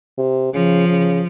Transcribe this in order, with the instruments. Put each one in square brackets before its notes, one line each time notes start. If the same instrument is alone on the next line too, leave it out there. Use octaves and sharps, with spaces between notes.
[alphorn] C3
[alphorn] C#3 [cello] F3
[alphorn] C#3